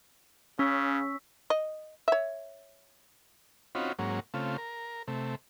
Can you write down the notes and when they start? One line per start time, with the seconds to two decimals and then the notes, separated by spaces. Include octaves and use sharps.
0.59 C#3 C#4 C#6 E6 B6
1.50 D#5
2.08 C#5 E5
3.75 C4 C#4 D#4 F4 F#4 B5
3.99 G#2 F#3 A#3 C#4
4.34 C#3 A3 C4 F4
4.58 A#4
5.08 C3 A3